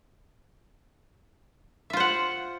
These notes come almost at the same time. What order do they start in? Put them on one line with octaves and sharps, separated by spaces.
E5 F4 C5 F#5